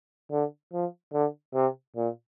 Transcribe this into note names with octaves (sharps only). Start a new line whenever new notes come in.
D3
F3
D3
C3
A#2